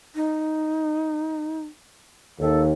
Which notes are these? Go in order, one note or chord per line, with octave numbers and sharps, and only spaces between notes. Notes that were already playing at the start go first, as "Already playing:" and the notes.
D#4
D#2 A4